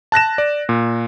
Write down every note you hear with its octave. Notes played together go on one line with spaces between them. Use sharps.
A5 F#6 A#6 E7
D5
A#2